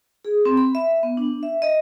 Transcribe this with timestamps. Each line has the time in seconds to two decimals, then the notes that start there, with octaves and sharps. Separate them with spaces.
0.25 G#4
0.45 C4
0.57 B5
0.75 E5
1.03 B3
1.17 D4
1.43 E5
1.62 D#5